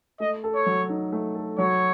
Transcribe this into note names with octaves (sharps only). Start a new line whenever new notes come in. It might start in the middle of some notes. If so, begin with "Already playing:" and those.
A3 D#5
A4
C#5
F#3
D#4
A3
A4
F#3 C#5